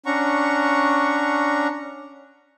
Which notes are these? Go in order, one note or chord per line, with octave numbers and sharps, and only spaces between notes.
C#4 D4 F#5 A#5 C#6